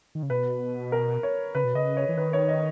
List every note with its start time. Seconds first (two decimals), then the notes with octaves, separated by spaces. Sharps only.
0.15 D#3
0.23 C#3
0.30 B2 B4
0.92 A#4
1.23 C#5
1.55 C#3 B4
1.64 B2
1.75 C#3 D#5
1.97 C#5
2.09 E3
2.17 D#3 B4
2.33 C#5
2.48 D#5